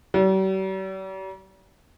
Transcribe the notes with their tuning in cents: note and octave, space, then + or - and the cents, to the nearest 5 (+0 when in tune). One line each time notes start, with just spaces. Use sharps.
G3 -45